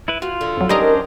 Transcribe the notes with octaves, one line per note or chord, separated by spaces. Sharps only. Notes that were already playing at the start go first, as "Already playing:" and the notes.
E4 B4
F4 F#4
D3
F2 F#3
D#3 G3 C#4 D4 A#4 C5 D#5 A#5